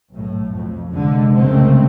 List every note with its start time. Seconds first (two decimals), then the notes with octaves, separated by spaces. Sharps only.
0.11 B1 A2
0.53 F2
0.89 F1 D3 G#3
1.34 C2 A#2 C#3 G#3 A3 C4